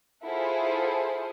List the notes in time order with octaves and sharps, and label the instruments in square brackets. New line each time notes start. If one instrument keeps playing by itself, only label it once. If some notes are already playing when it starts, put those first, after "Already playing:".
[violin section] E4 F4 G#4 A4 C5 F#5